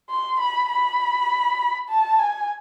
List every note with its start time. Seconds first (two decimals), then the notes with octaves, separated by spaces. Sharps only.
0.10 C6
0.40 B5
0.70 B5
1.89 A5
2.19 G#5